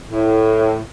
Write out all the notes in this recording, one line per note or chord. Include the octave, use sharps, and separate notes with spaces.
A2